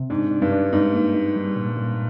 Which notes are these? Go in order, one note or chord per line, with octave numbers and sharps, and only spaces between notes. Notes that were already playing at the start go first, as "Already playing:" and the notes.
Already playing: C3
G#2 D4
D4
G2
D4
G#2 D#4
A#3
D#4
G3
A#2
A#2